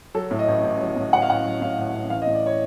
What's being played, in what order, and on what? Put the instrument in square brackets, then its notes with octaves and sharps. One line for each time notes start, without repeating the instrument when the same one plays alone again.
[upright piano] F#3 A4
A2
D#5
A1
A1
F#3
A2
A1 F#5
F5
A1 F#5
F#3
A2 F5
A1
A1
E3 F5
D#5
A2
D5
C#5